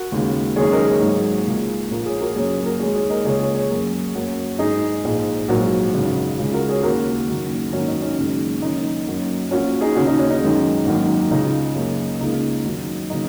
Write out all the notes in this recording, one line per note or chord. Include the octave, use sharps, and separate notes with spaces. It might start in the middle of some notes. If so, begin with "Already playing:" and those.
Already playing: F#4 A#4
D#2 C#3 G#3
F#1 F#2 D#3 G#3 G#4 C#5
A#4 D#5
G#4 C#5
G#1 G#2 F#3 A#3
C#2 C#3 A#3
A#1 A#2 A#3
G#4 C#5
F#4 A#4
F#1 F#2 F#3 A#3 G#4 C#5
F#4 A#4
D#2 D#3 G#3 G#4 C#5
G#4 C#5
A#4 D#5
C#2 C#3 A#3 G#4 C#5
G#4 C#5
G#4 C#5
F#2 F#3 A#3
F#2 F#3 A#3
G#1 G#2 G#3 D#4 G#4
A#1 G#2 G#3
A#1 G#2 F#3 F#4 A#4
G#1 F#2 C#3 G#3
C#2 C#3 G#3
F#4 A#4
G#4 C#5
D#2 C#3 A#3 F#4 A#4
F#1 F#2 D#3 F#3
G#1 F#2 D#3 A#3 C#4 F#4
D#4
C#4
F#1 F#2 D#3 G#3
F#1 F#2 D#3 D#4
F#2 F#3 A#3
A#1 A#2 A#3 C#4 F#4
D#4 G#4
D#2 C#3 A#3 C#4 F#4
D#4
C#4
D#4
F#2 D#3 G#3
G#1 F#2 D#3 F#3 A#3
C#2 C#3 G#3 D#4
F#2 C#3 A#3
C#2 C#3 A#3 D#4
F#2 D#3 F#3
C#3 F#3 A#3 D#4